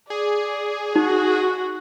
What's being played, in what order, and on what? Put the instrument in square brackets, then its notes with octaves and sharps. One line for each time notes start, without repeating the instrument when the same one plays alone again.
[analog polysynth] G#4 [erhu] D5
[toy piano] D#4 [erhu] F#4